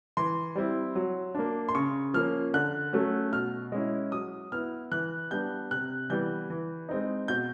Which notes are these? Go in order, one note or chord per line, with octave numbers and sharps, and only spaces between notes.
E3 C6
G3 C4 E4
F#3
A#3 D4
C6
C#3 C#6
F3 A#3 C#4 F6
D3 F#6
F#3 A3 C#4
B2 F6
G#3 C#4 E4
F#3 D#6
B3 E4 F6
E3 F#6
G3 B3 D4 G6
C3 F#6
E3 G3 B3 G6
E3
G#3 C4 D#4
B2 G6